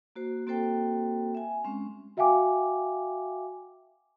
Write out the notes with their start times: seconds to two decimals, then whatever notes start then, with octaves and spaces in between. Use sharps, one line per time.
0.16 A#3 F#4 C5
0.47 A#3 C4 F#4 A4 C5 G5
1.35 E5 G#5
1.64 G#3 C4 C#4
2.17 F#4 E5 F5 G5 G#5 D6